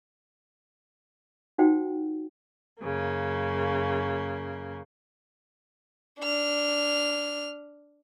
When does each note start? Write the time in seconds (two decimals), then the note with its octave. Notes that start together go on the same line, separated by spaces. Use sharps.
1.58 D#4 F4 F#4 C5 F#5 G5
2.81 F#2 C#3 A#3
6.20 D4 F6